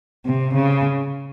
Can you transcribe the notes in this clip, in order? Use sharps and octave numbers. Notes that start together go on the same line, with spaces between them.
C3
C#3